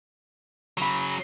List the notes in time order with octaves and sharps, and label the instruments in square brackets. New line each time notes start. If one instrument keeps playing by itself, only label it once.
[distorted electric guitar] C#3 F#3 [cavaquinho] A#5 B5